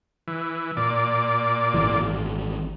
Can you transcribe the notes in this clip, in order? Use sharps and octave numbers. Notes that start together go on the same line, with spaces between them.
E3
A#2 D5
G#1 E3